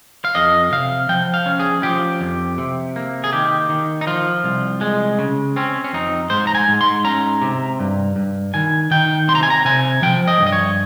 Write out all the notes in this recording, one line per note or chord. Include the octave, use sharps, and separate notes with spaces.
F5
F2 D#5
C3 F5
F3 G5
F5
C#4
G#4
F3 G4
F2
C3
A#3
G#4
D#3 G4
D#3
D#4
F3 F4
C2
G#3
C#3
C4 C#4
C#4
F2 D#4
G#2 C5
A#5
G#5
G#2
C6
C#4 A#5
C3
G2
G2
D#3 G#5
D#3 G5
C3 C6
A#5
G#5
A#5
C3 G#5
F3 G5
D#5
G2
D#5
C#5